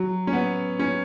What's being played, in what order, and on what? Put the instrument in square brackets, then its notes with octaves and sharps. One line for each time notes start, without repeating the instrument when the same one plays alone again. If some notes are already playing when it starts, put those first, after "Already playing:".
Already playing: [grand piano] F#3
C#4
B3
C#4